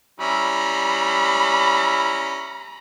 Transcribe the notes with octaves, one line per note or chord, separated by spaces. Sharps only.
G3 C#4 E4 A#5 B5